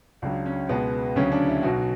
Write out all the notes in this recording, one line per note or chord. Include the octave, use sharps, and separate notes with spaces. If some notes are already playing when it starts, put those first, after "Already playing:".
C#2 C#3 F#3 D4
C#4
C#2 B2 G#3 B3
D2 C#3 F#3 C#4
D4
E4
B1 B2 F#3 F#4